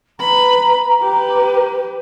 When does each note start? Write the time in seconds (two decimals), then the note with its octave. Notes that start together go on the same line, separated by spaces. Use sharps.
0.19 B4 A#5 B5
1.00 G4 B4